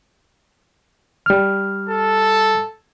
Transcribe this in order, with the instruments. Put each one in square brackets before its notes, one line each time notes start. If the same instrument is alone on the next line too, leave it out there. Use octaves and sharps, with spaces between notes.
[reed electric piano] G3 F6
[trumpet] A4